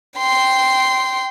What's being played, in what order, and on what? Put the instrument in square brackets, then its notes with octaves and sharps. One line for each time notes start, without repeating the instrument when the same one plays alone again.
[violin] G5 C6